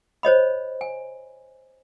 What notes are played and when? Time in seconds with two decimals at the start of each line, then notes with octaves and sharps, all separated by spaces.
0.23 C5 C#5 D#5 B5
0.81 G#5